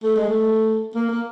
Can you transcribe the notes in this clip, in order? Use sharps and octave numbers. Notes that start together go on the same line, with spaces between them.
A3
G#3
A3
A#3
A#3